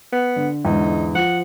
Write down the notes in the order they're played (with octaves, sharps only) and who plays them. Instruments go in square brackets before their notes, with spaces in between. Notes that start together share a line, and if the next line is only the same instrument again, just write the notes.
[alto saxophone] B3
[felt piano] D3
[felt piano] E2 G#2 D3 [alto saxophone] D#4
[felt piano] F3 [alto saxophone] F#5